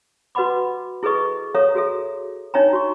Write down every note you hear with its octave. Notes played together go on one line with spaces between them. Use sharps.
F#4 B4 D#5 F#5 B5 D6
E4 G#4 A4 B4 D#5 C#6
A4 C#5 E5 F5 A#5 D#6
F#4 G#4 A4 E5
D4 D#4 C#5 E5 G5 A#5
F#4 A#5 C#6